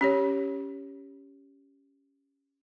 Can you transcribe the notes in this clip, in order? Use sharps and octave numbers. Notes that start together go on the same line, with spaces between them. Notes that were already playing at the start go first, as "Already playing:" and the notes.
C#4 G4 C#5